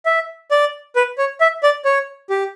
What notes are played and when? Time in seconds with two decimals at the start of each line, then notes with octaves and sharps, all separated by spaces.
0.06 E5
0.51 D5
0.96 B4
1.18 C#5
1.41 E5
1.63 D5
1.85 C#5
2.30 G4